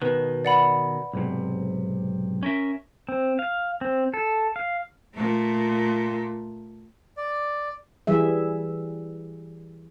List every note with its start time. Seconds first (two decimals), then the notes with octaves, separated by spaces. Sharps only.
0.02 B2 D#3 B4
0.45 D5 F#5 B5
1.13 B1 G#2 C3
2.43 C#4 A#4 E5
3.09 C4
3.39 F5
3.81 C4
4.14 A4
4.56 F5
5.14 A#2 A3
7.17 D5
8.07 E3 G3 G#4 E5